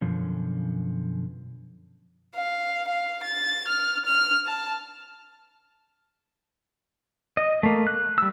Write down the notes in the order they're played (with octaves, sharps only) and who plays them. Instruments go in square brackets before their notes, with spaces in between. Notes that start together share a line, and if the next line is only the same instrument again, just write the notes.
[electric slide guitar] F#2 B2 D3 F3 C#4
[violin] F5
F5
A6
F6
F6
A5
[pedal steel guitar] D#5
A3 A#3
F#6
G3 E6